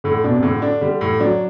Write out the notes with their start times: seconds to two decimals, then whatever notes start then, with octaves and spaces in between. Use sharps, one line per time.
0.04 A2 D3
0.24 B2 D4
0.34 C3
0.43 A2 D3
0.62 D4
0.81 D3 G3
1.01 A2
1.20 F#3 D4